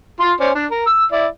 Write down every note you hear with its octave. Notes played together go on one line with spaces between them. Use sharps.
F4 C6
C#4 C5 D5
D4
A#4
E6
E4 D5